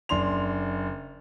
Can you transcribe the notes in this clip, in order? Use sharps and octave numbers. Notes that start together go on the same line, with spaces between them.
F#1 D4 C6 F7